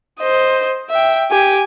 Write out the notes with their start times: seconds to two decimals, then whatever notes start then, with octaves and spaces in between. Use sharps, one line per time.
0.20 C5 D#5
0.90 E5 G5
1.31 G4 G#5